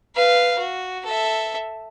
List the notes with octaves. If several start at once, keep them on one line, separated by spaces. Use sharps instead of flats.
B4 F5
F#4
A4 E5